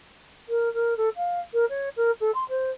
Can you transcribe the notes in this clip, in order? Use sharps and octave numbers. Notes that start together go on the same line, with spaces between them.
A#4
A#4
A4
F5
A#4
C#5
A#4
A4
C6
C5